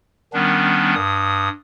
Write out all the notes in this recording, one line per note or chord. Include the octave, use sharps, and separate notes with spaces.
D#3 G3 B3 C#4 D4
G2 D#6